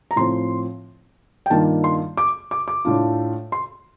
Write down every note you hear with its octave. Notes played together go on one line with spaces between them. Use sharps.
A#5
A2 F3 C4 C6
G5
G2 D#3 A#3 D4 F4 A5
C6
D6
D6
D6
A2 A3 D4 F4
C6